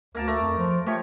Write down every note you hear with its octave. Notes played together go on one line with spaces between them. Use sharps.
D2 A#3 A#4 A5
A3 A#4 D5
F2
F3
F3 A3 G4 C#5